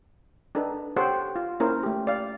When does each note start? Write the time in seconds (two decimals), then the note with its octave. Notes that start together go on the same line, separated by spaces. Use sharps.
0.55 D4 D#4 A4 B4
0.96 G4 A4 C5 C#5 F#5 G5
1.36 F4
1.60 A#3 C#4 E4 A#4 C5
1.83 A3 G4
2.07 D5 F5